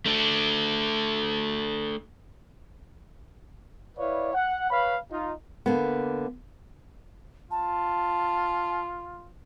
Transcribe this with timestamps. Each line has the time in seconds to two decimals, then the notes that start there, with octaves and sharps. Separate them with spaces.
0.06 A3 D4
3.98 E4 B4 C#5 D5 F5
4.33 F#5
4.70 B4 C#5 F5 B5
5.11 D#4 F4
5.66 D3 A#3 B3
7.51 F4 A5